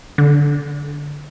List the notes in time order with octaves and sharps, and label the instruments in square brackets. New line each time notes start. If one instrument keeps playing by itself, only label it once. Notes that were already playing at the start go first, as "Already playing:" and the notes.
[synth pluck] D3